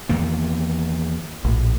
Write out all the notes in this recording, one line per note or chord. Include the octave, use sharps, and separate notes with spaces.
E2 D#3 A#3
A#1 A2